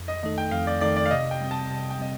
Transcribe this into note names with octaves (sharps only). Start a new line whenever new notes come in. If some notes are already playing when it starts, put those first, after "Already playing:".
Already playing: F2
D#5
D#3 A3 D#4 A4 D#5
G5
F2 F5
D5
D#3 A3 D#4 A4 D5
D5
F5
C3 D#5
G5
G3 C4
A5
C3 A5
G5
G3 C4 D#5